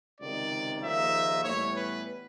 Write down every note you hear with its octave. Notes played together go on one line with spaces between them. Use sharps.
C#2 C3 D#3 D5
D#2 C#3 F3 A#3 D#4 E5
A2 E3 G3 B3 C#5
B4